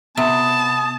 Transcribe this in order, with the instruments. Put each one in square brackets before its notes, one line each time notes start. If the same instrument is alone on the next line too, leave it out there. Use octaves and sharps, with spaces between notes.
[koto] C3 [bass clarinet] B3 [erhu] A5 [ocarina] D#6